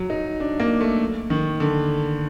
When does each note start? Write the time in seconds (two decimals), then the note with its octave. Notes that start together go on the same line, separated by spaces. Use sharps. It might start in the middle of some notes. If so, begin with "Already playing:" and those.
Already playing: F#3
0.10 D#4
0.40 D4
0.60 A#3
0.81 A3
1.30 D#3
1.60 D3